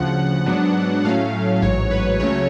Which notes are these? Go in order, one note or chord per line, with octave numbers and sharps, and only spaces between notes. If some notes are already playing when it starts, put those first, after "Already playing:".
Already playing: D2 C#3 F3 F#5
G#2 F#3 B3 D4
A2 F#3 A3 C#4 F5
A1 G#2 F#3 C#5
B4
C#2 C#3 F#3 A3 C#4 C#5